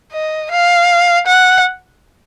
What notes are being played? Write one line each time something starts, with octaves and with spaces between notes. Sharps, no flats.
D#5
F5
F#5